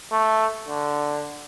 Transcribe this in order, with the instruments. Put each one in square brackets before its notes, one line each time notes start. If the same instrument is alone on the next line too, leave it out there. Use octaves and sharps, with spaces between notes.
[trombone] A3
D3